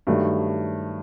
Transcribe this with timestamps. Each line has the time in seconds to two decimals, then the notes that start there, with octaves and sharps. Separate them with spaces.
0.07 G2 D#3 F#3 A3